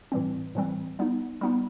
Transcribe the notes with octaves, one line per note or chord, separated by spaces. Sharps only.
A2 E3 G3 C4
A2 E3 G3 C4
G3 B3 D#4
G3 B3 D#4